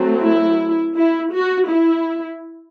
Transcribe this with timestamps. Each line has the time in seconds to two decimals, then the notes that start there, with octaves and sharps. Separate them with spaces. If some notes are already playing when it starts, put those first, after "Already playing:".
Already playing: F#3 A3 C4
0.23 E4
0.96 E4
1.33 F#4
1.70 E4